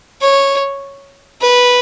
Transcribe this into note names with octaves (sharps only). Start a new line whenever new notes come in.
C#5
B4